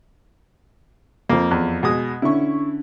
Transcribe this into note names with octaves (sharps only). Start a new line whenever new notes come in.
F2 F3 A#3
E2
B2 G#3 D#6
D3 C#4 E4 C#6